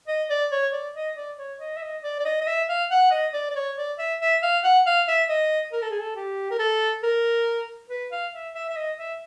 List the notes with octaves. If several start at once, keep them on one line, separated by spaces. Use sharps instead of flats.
D#5
D5
C#5
D5
D#5
D5
C#5
D#5
E5
D#5
D5
D5
D#5
D#5
E5
F5
F#5
D#5
D5
D5
C#5
D5
E5
E5
F5
F#5
F5
E5
D#5
A#4
A4
G#4
A4
G4
A#4
A4
A#4
B4
F5
E5
E5
E5
D#5
E5